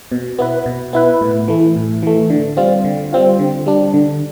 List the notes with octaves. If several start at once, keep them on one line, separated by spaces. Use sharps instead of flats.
B2
B3 E4 B4
B2
B3 E4 B4
A2
E3 A3
A2
E3 A3
D3
G3 C4 F4
D3
G3 C4 F4
D3
G3 D4
D3